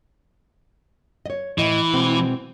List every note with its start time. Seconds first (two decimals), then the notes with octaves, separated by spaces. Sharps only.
1.26 C#5 D#5
1.58 A2 E3 D#5
1.93 B2 G#3 C4